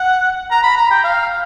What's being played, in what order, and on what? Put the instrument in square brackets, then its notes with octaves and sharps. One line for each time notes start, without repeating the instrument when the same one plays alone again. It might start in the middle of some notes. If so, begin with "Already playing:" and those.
Already playing: [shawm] F#5
A#5
B5
A#5
G5
F5